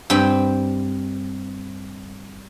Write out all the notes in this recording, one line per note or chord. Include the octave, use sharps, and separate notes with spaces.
G2 C4 G5 B5